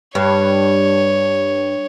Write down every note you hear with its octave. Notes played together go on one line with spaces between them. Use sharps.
G2 C#5